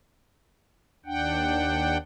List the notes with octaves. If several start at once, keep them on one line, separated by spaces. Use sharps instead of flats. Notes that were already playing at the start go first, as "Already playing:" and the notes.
D#2 D4 F#5 G5